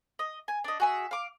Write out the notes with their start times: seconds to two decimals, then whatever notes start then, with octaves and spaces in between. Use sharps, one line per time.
0.19 D#5
0.48 G#5
0.64 D4 D#5
0.80 F#4 G#4 E5
1.11 F5 D6